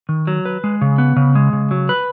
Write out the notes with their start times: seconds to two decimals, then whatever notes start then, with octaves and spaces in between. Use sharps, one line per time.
0.09 D#3
0.27 F#3
0.45 B4
0.64 G#3
0.81 C#3
0.98 B3
1.16 C#3
1.35 G#3
1.53 C#3
1.71 F#3
1.89 B4